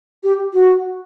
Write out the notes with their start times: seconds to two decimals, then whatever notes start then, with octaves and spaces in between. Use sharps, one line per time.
0.23 G4
0.53 F#4